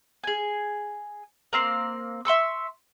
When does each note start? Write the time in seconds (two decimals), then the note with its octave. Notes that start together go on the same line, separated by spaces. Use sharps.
0.24 G#4 G#5
1.53 A#3 C4 C6
2.25 E5 C6 C#6 E6